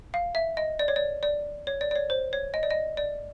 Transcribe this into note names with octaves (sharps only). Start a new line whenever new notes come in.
F5
E5
D#5
D5
C#5
D5
D5
C#5
D5
D5
C#5
C5
C#5
D#5
D5
D#5
D5